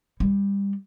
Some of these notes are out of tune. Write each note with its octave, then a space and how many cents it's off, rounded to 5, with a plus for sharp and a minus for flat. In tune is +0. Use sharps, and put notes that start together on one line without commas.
G3 +25